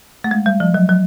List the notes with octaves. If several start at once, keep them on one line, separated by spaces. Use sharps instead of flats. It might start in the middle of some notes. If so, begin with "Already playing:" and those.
A3
G#3
G3
F3
F#3
F#3